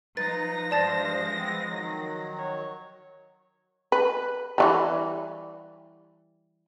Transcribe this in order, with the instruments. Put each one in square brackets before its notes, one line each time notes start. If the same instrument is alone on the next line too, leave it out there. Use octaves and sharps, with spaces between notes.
[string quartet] F3 A#6 [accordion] D#4 [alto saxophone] B4 [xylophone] A6
[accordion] G2 C5 [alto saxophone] G#3 [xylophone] D5 A5 A6
[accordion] B3 C4
D#3 F#3
[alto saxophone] C#5
[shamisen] B4
E3 F#3 G3